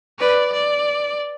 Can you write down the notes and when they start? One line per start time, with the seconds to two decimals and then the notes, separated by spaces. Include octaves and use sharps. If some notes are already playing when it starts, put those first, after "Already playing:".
0.20 B4 D5
0.54 D5